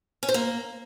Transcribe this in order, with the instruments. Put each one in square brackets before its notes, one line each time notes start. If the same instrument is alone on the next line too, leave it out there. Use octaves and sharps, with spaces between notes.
[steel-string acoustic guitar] C#4
C5
A#3